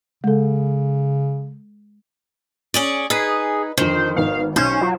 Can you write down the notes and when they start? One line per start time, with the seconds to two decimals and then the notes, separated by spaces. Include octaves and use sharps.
0.24 C#3 G#3 A4
2.74 C#4 G#4 D5
3.10 D#4 G#4 B4
3.77 F2 D3 D#3 C5
4.16 G#1 B3 F5
4.56 B1 C#4 C5
4.81 F#3 F4